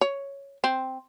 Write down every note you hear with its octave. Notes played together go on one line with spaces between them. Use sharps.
C#5
C4